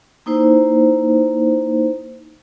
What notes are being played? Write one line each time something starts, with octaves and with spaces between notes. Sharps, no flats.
A#3 D#4 E4 C5